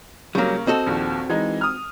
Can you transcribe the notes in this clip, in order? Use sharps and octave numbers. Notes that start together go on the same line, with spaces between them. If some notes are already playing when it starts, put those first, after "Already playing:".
C#3 F#3 G3 A#3
C4 F#4 A4 D#5
A#1 D#2
E3 G#3 D#4
D#6 F6